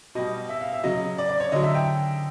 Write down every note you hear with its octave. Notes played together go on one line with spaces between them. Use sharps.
B2 G3 D#5
E5
F5
E5
C#3 F#3 D#5
D5
D5
C#5
D3 F#3 D#5
E5
G5